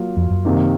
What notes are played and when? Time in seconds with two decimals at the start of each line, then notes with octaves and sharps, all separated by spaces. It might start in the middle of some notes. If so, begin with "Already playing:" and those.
Already playing: F#3 A#3 F4
0.17 F2
0.31 F#2
0.45 C3 D#3 A#3